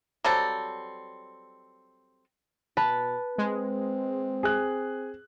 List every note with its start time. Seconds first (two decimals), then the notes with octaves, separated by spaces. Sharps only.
0.24 F#3 G3 C4 A4
2.77 B2 B4 A5
3.38 G#3 C4
4.43 G#4 F#6